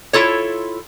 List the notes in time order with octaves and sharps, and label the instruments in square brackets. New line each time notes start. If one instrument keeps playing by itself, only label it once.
[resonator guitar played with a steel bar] E4 F4 A4 C#5